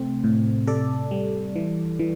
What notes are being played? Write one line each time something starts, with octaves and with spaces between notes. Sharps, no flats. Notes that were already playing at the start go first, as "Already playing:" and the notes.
Already playing: C3 A3 C4 C5
A2
C3 A4 D5
G3
E3
E3